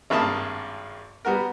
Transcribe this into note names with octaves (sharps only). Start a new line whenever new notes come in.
G#1 G2 A#3 E5 A5 D#6
G3 B3 F#4 A#4